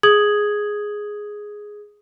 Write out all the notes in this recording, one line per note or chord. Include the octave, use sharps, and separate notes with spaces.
G#4 D#6 G#6 F#7